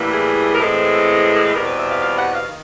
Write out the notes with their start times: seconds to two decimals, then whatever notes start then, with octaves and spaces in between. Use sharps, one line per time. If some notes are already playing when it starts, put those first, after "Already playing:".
Already playing: A2 E3 G3 A#3
0.12 G#4
0.54 A#4
0.59 A2 E3 G#3 C4 A4
1.43 B4
1.53 E2 B2 G3 C4 A#4
1.65 B4
1.78 E5
1.89 F5
2.01 F5
2.18 F#5
2.33 F5
2.48 D#3